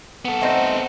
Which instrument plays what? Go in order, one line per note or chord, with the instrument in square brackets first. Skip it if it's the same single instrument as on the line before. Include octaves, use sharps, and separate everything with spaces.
[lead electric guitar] B3 A4 [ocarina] F#5
[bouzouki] A3 C4 D#4